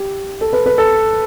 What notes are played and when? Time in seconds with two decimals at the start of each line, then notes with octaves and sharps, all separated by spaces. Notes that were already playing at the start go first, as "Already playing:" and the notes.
Already playing: G4
0.41 A4
0.53 B4
0.66 B4
0.78 A4